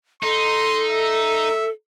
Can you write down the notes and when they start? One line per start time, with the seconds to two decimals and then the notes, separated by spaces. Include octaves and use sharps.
0.23 D#4 A4 C6
0.90 E5